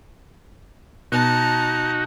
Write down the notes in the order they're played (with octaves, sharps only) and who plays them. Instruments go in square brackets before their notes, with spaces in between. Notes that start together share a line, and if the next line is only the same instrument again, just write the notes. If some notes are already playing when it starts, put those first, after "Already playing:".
[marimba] B2 B3 F#6 [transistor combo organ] D#4 F#4 [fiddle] A5 A#5